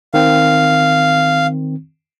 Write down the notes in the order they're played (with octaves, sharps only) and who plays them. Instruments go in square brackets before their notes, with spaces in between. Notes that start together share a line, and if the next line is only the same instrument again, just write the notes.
[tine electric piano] D#3 C4 [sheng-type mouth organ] F5